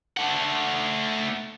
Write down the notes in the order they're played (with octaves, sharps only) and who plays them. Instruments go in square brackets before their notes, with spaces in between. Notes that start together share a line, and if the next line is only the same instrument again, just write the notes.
[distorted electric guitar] A3 F#5